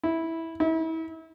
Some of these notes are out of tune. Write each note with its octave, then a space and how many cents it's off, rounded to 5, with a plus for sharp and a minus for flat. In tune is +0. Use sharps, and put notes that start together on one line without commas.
E4 -10
E4 -35